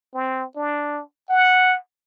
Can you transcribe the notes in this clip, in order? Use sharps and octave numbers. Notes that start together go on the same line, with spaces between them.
C4
D4
F#5